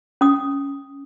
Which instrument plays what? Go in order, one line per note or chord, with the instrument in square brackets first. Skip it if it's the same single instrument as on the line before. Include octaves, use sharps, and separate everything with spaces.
[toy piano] C#4 D#6